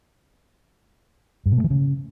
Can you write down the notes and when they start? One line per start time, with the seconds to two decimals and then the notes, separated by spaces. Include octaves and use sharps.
1.46 G2
1.52 B2
1.58 A3
1.64 E3
1.70 C#3